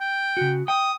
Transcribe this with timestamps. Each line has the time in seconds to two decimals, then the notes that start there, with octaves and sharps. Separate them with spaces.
0.01 G5
0.37 C#3 F#4
0.68 G5 D#6